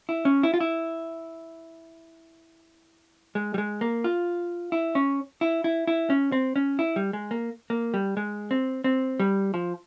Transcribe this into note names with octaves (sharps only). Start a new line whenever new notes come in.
E4
C#4
E4
F4
E4
G#3
G3
G#3
A#3
F4
E4
C#4
E4
E4
E4
C#4
C4
C#4
E4
G3
G#3
A#3
A#3
G3
G#3
C4
C4
G3
F3